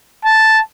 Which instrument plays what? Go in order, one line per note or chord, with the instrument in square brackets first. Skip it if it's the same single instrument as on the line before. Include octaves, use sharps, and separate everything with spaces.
[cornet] A5